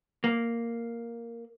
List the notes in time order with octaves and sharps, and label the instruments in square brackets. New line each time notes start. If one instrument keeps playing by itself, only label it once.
[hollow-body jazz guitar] A#3